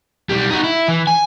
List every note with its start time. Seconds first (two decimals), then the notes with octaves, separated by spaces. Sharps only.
0.30 B1 G3
0.50 D#4 F#4
0.64 E4
0.88 E3
1.07 G#5